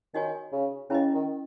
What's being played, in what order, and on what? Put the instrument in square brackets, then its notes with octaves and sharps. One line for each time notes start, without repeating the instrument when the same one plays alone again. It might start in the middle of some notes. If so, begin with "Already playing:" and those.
[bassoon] D#3 [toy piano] D#4 F#4 C#5 G#5
[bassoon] C#3
[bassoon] C#3 [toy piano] C#4 E4 B4 D#5
[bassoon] D#3